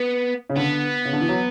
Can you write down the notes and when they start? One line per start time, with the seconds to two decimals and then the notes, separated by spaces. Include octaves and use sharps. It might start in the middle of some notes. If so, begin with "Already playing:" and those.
Already playing: B3
0.50 C#3
0.56 D3 B3
1.05 C#3
1.13 D3
1.21 E3
1.29 F#3